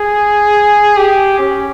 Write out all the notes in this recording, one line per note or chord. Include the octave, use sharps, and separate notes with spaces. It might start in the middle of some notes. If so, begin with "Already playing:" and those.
Already playing: G#4
G4
C#4